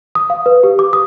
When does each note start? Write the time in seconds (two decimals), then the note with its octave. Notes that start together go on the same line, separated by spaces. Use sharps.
0.15 D#6
0.30 F5
0.46 B4
0.63 G4
0.79 D6
0.93 D#6